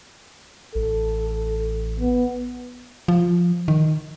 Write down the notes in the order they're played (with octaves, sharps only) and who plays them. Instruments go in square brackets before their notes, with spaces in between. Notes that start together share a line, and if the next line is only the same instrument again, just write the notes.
[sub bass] A1 [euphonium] A4
[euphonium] B3
[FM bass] F3
D#3